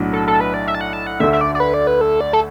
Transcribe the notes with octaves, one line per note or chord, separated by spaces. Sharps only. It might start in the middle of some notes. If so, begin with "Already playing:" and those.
Already playing: B1 A2 F#3 D4 F#4
A4
A4
B4
D5
E5
A5
F#5
A5
F#5
D2 D3 A3 E5
E5
D5
D5
B4
D5
B4
A4
D5
A4